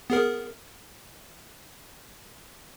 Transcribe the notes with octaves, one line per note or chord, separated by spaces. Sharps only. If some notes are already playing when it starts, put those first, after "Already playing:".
B3 G#4 A#4